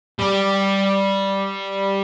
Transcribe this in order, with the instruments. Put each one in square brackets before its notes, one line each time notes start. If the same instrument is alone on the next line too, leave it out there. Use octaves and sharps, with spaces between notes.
[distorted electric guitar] G3